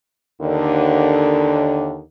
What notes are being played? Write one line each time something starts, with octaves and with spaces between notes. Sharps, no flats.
D#2 D3